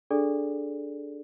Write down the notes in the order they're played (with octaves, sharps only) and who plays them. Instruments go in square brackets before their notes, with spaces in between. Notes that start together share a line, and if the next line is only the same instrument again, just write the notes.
[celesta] D4 G#4 A4 D5